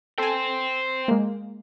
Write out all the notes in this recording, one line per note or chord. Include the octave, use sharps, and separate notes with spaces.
A4 C5 G5 G#5
G#3 A#3